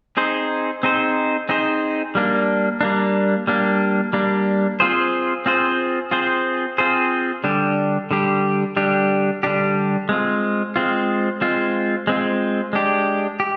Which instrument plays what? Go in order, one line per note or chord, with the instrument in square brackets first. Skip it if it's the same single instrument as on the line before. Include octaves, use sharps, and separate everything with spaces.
[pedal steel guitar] C4 D#4 G#4 C5
C4 D#4 G#4 C5
C4 D#4 G#4 C5
G3 A#3 D4
G3 A#3 D4
G3 A#3 D4
G3 A#3 D4
C4 F4 G#4 C5
C4 F4 G#4 C5
C4 F4 G#4 C5
C4 F4 G#4 C5
D3 G3 D4 G4
D3 G3 D4 G4
D3 G3 D4 G4
D3 G3 D4 G4
G#3 C4 F4
G#3 C4 F4
G#3 C4 F4
G#3 C4 F4
G#3 D4 G4
G4